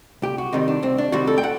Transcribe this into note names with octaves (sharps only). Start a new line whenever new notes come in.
C2 G4
F#4
C3 D#3 G3 D#4
D4
C2 C4
D4
C3 D#3 G3 F#4
A4
G5
F#5